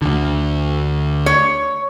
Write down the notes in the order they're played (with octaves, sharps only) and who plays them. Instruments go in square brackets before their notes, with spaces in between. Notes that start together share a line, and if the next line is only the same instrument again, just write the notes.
[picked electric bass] D2 D3
[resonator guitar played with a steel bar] C#5